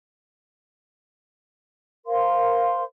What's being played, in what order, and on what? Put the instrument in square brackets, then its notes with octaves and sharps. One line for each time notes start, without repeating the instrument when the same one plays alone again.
[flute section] A#4 C5 F5 C6